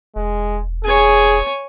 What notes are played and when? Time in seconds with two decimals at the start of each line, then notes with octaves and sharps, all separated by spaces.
0.16 E1 G#3
0.84 G#4 C#5 G#5